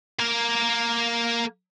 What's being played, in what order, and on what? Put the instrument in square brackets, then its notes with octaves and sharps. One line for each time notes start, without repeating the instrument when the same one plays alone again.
[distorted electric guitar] A#3 A#4